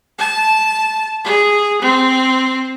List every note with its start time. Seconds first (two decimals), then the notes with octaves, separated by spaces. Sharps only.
0.19 A5
1.24 G#4
1.82 C4